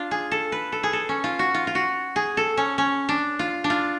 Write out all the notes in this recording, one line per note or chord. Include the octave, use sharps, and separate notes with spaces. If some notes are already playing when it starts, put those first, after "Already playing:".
Already playing: D4 F4
G#4
A4
B4
A4
G#4
A4
C#4
F4
F#4
F4
F4
F#4
G#4
A4
C#4
C#4
D4
F4
D4
F4